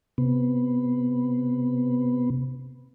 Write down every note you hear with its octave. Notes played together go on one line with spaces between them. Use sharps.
C3 B3